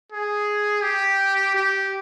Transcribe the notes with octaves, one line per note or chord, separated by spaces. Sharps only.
G#4
G4
G4